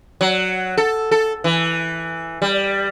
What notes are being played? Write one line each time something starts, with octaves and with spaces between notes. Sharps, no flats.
F#3
A4
A4
E3
G3